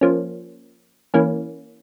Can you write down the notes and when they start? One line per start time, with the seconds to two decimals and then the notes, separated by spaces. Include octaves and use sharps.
0.01 F3 A#3 C#4
1.14 E3 A#3 C#4